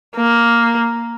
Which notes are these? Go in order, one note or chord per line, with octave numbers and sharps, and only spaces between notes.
A#3